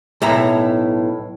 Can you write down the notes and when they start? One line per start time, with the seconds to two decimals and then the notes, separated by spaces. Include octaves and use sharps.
0.22 B1 A2 E5 A#5